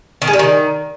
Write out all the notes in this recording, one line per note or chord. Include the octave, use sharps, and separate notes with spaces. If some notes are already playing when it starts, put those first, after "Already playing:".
D#3
G#3
G3
D#3